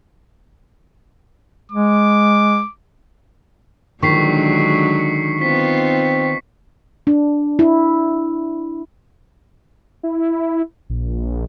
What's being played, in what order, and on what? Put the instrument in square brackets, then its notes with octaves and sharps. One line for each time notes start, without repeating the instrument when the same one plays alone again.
[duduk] G#3 [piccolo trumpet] D6
[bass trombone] A#1 [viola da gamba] D3 F#3 G#3 [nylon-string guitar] D#3 [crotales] C#6 B6 C7
[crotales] C#7
[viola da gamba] B3 D#4 F4 [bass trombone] C4 [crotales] B6
[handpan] D4
E4
[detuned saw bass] E4
A#1